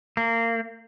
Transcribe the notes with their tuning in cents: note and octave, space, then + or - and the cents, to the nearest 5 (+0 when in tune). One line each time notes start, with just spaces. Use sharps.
A#3 -25